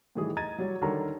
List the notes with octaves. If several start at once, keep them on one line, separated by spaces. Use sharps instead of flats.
A2 D#3 E3 G3 G#4
D#5 A#5 G#6 A6 D#7
F#3 G3 F#4 C#5
D3 D#3 G3 A#4 C#5 A#5